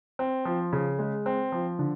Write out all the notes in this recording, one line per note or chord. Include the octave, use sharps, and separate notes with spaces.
C4
F3
C#3
G#3
C4
F3
D3